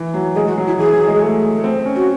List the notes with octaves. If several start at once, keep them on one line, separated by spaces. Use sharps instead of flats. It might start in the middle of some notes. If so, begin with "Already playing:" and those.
Already playing: E3
F#3
G#3 G#4
F#4
F#3
E4
E3 G#4
F#3
G#3
A3
A3
C4
C#4
F#4